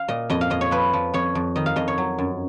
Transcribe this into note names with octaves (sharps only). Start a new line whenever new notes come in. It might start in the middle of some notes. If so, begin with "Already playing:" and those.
Already playing: F5
A#2 D#5
F2 D#5
F5
F2 D#5
C#5
F3 B4
F3
F2 C#5
F2
D#3 D#5
F5
F2 D#5
C#5
F#3
F#2